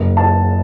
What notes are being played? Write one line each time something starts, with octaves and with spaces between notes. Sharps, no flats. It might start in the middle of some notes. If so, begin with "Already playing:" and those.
Already playing: F#1
A5